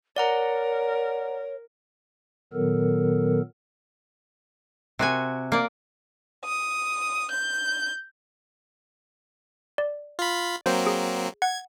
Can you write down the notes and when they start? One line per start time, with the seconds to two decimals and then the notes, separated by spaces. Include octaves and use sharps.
0.16 A#4 C#5 D5 F#5 A#5
2.53 A#2 D#3 F#3 B3 A4 A#4
4.99 C3 F#4 G#5
5.52 A#3 D5
6.44 D#6
7.30 G6
9.78 D5
10.19 F4 B5
10.66 F#3 A#3 C4 C5
10.87 G#4
11.42 F#5 G#6